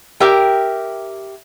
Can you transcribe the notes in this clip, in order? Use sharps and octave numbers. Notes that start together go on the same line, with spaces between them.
G4 A#4 E5 G5